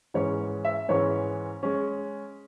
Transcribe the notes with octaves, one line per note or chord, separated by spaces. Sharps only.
G#2 E3 G#3 C#4 C#5
E5
G#2 E3 G#3 C#4 C#5
G#3 C#4